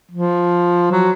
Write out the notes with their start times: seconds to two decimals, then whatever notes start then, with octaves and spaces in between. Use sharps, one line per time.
0.12 F3
0.92 F#3